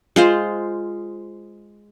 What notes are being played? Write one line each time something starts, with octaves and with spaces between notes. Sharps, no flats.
G#3 F4 C5